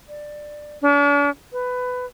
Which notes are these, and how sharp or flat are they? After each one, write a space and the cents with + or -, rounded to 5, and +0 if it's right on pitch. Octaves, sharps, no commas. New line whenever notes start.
D5 +15
D4 -45
B4 +15